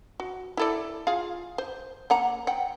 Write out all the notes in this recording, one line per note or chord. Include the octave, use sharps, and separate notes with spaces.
F#4
E4 A4 D5
F4 G#4 F5
C5
A#3 F#5 A#5
F#5 G5